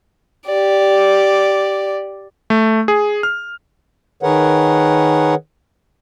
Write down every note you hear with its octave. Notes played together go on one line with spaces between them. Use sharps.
G4 D5
A3
G#4
F6
D#3 G#4 A#4 B4 C#5 F#5